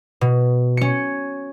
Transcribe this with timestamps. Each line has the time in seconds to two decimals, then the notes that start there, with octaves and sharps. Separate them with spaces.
0.21 B2
0.77 C#4 C#7